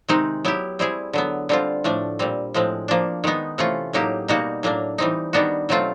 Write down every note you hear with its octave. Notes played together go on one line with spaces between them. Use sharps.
C3 D#3 G#3 C4 D#4
F#3 B3 E4 G4
G3 C4 E4 G#4
D3 F#3 B3
D3 G3 C4 F4
A2 F3 A3 D4
A#2 G3 C4
A2 F3 G#3 C4
F3 A#3 D4
D#3 G#3 B3 D#4
C3 E3 A3 C#4 F4
A2 F#3 A#3 D#4 G4
B2 G3 A#3 D#4 F#4
A2 F#3 A#3 D4
E3 G3 C4 D#4
D#3 G3 B3 D4 F#4
B2 F#3 A3 C4 F4